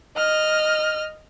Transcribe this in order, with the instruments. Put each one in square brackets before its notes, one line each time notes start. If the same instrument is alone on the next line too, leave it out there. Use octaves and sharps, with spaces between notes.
[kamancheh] D#5 F6